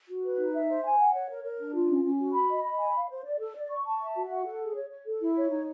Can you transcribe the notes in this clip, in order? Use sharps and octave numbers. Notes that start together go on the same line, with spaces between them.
F#4
B4
D#4
E5
C5
G#5
F#5
C#5
A#4
A#4
D4
F4
C#4
C#4
F#4
B5
D#5
B5
G#5
F5
C5
D5
A4
D5
C#6
A5
E5
F#4
F#5
A4
G#4
C#5
C#5
A4
E4
C#5
D#4